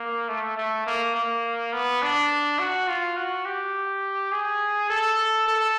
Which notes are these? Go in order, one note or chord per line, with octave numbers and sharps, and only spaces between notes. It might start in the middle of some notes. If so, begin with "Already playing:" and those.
Already playing: A#3
A3
A3
A#3
A#3
B3
D4
F#4
F4
F#4
G4
G#4
A4
A4